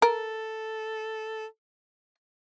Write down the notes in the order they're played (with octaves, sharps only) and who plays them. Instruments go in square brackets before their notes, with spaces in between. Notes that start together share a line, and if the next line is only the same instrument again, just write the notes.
[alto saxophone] A4 [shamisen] A#4